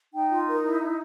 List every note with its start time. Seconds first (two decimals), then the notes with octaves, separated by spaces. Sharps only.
0.13 D#4 G5
0.30 F4
0.47 A#4
0.63 E4
0.80 E4